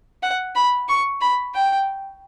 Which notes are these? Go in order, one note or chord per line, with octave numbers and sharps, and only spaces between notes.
F#5
B5
C#6
B5
G5